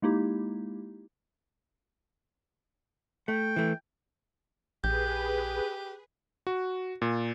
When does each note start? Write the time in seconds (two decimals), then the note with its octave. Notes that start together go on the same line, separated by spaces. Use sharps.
0.02 G#3 A#3 D#4 E4 G4
3.28 A3 G5
3.56 E3 A3
4.84 A#1 G4 G#4 B4 G6
6.47 F#4
7.02 A#2